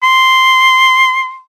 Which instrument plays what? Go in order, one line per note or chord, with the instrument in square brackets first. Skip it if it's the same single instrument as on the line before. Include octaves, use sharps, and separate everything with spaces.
[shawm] C6